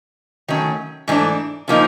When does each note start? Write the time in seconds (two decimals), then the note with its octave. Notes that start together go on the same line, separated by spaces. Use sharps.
0.48 D#3 F#3 A3 C#4
1.08 G#2 E3 A3 D4
1.68 C#3 F3 A#3 D#4